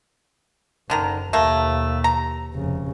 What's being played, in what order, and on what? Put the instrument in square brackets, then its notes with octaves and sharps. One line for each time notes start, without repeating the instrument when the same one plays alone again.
[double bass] F#1 [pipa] D3 D#3 A#5
[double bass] D#2 B2 [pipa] A3 A#3
[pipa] A#5
[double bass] F1 C#3